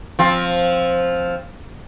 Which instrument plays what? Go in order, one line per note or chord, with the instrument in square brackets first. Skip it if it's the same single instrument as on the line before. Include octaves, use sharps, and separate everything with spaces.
[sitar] F3 C4